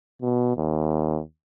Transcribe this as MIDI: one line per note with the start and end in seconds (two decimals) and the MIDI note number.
0.22 0.52 47
0.57 1.20 39